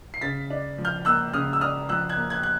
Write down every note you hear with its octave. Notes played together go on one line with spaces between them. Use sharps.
C7
C#3 A6 B6
D4
F3
F6 G6
A#3 E6 F#6
C#3 D#6 F6
E6
D4 D#6 F6
F3 E6 F#6
F#6 G#6
A#3
F#6 G#6
F#6